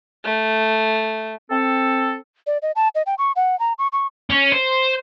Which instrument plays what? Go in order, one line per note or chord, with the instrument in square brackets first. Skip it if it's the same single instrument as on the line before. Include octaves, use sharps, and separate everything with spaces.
[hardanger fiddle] A3
[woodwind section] C4 A4
[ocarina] D5
D#5
A5
D#5
G5
C#6
F#5
A#5
C#6
C#6
[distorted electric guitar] C#4
C5